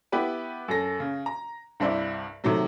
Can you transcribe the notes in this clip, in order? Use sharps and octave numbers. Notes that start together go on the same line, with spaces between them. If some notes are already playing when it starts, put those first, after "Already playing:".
B3 E4 G4 B4
F#2 A4 A#6
C#3
A#5
C2 G2 E4 C5 D5
C3 D#3 F#3 A3